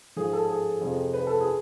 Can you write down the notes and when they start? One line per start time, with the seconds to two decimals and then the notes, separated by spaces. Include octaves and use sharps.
0.16 G#2 F3 G#4
0.33 A4
0.49 G#4
0.81 F2 C3 F3
1.14 B4
1.27 A4
1.41 G#4